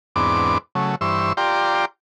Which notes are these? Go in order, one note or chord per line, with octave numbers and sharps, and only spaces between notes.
E2 G#2 B3 C4 D4 D6
C#3 F#3 A3
G2 E3 C5 C#6 E6
F4 G4 D5 G5 A#5 C6